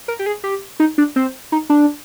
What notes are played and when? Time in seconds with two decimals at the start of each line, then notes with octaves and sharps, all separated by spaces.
0.08 A#4
0.19 G4
0.26 G#4
0.44 G4
0.80 D#4
0.98 D4
1.16 C4
1.52 D#4
1.70 D4